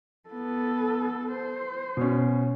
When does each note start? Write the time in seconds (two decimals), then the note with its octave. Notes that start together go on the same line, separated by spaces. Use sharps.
0.29 B3 A4
1.32 C5
1.97 B2 C#4